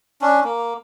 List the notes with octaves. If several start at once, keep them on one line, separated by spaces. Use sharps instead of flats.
C#4 D4
A#3